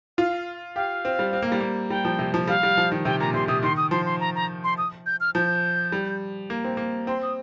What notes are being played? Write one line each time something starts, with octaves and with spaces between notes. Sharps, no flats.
F4 F5
G4 F5
C4
G3
C4
A#3
G3
A#3
G3 G5
F3
C3
F3
G3 F5
G3
F3
D#3
C3 G5
A#2 A#5
C3 C6
C3 D#6
D#3 C6
D#6
F3 C6
C6
A#5
A#5
C6
D#6
G6
F6
F3 G6
G3
A#3
C4
A#3
C4 C6
D#6